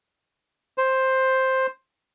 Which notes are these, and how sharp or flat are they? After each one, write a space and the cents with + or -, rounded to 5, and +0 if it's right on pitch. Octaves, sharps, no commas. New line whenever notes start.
C5 +5